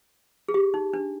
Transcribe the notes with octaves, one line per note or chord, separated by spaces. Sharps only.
G#4
G4
D#4
D4